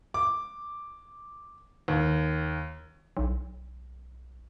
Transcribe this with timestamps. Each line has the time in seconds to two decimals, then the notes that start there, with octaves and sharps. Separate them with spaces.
0.14 D6
1.88 D#2
3.17 B1